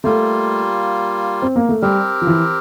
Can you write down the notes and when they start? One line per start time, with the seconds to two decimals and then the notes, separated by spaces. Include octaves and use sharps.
0.04 G3 A3 A#3 F4
1.42 C4
1.56 A#3
1.69 A3
1.82 G3 C4 G4 A#4
2.22 F3
2.27 E3